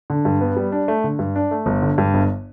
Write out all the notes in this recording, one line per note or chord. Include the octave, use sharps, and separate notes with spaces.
D3
G2
B3
G3
D4
A3
D3
G2
D4
A3
G1
D3
G2
G1